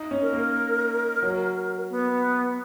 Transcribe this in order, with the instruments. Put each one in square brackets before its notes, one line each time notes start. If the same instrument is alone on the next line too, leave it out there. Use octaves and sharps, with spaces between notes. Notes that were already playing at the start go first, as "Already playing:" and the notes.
Already playing: [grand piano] D#4
C#4
[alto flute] A#4
[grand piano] A#3
F#3
[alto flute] B3